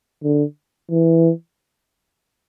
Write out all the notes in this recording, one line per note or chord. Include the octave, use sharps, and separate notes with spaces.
D3
E3